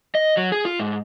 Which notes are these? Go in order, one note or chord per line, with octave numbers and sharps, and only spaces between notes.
D#5
F#3
G#4
F4
G#2